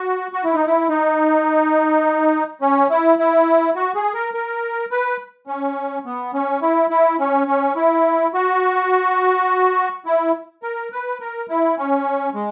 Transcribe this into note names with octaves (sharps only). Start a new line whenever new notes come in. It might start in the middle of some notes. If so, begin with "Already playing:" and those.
Already playing: F#4
F#4
E4
D#4
E4
D#4
C#4
E4
E4
F#4
G#4
A#4
A#4
B4
C#4
B3
C#4
E4
E4
C#4
C#4
E4
F#4
E4
A#4
B4
A#4
E4
C#4
G#3